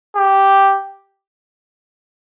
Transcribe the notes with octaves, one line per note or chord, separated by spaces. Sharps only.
G4